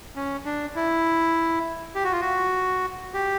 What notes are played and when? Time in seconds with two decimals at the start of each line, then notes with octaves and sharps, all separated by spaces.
0.16 C#4
0.45 D4
0.75 E4
1.95 G4
2.04 F#4
2.12 F4
2.20 F#4
3.14 G4